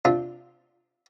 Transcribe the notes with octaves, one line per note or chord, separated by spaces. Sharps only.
C3 D4 F4